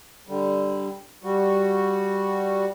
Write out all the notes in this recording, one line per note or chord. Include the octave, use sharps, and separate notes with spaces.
D3 G3
G3 F#4